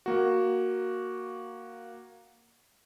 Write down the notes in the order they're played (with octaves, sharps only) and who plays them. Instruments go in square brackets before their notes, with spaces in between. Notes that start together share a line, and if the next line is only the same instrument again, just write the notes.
[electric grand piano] A#3 F#4